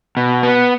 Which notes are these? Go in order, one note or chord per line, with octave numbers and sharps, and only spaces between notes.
B2
B3